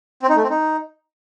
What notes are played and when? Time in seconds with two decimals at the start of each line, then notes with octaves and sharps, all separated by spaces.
0.22 C4
0.29 D#4
0.36 A3
0.43 C4
0.50 D#4